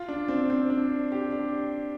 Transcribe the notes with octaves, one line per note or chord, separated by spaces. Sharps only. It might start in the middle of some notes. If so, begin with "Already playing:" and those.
Already playing: F4
D4
C4
C4
D4
G4
D4